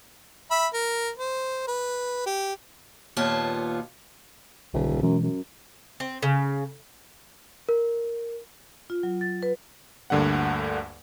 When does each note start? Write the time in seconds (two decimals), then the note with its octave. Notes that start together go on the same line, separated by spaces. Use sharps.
0.51 E5 B5
0.74 A#4
1.18 C5
1.68 B4
2.26 G4
3.17 D#2 A#2 B3 F4 C#5 A5
4.74 D#1 B1 D3
5.02 F#2 B2 E3 G#3
5.23 F#2
6.00 C4
6.23 C#3
7.69 A#4
8.90 F4
9.03 F#3
9.21 A6
9.43 B4
10.10 D2 G2 D3 A#3 F#5